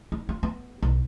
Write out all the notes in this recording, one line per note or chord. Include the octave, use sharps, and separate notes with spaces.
D#4
F4
B3
B1